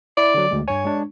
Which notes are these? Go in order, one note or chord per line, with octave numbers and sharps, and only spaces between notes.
E4 D5
D3 F#3
D2 G#3
G2 C#5 G#5
G#3 D4